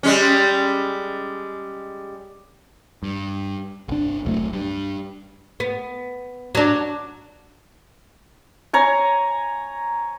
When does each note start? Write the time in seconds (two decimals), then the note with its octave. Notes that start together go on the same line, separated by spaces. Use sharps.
0.03 G3 G#3 C#4
3.03 G2
3.88 G1 C2 D4
4.25 E1 C2 F#3 A3
4.53 G2
5.60 B3
6.55 F#3 D4
8.73 C#5 G#5 A#5